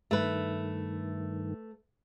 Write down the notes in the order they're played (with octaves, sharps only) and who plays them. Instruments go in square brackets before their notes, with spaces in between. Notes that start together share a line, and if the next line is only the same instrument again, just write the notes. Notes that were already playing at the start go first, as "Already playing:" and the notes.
[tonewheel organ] G2 D#3 [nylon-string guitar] A3 B4